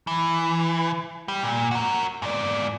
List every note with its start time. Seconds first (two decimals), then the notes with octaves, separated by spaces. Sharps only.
0.07 E3
1.28 G3
1.43 A#2
1.71 F#4 A#4
2.22 G#2 D5